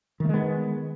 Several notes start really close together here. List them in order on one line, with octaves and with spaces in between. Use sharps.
D#3 A3 G#3 B3